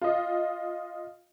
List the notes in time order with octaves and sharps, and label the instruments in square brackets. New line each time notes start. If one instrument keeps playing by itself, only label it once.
[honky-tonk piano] F4 D#5